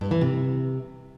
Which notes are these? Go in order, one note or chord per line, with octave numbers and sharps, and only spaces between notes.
G2
E3
C3